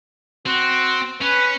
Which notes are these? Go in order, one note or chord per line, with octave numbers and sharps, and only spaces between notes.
C4 F#4
C#4 B4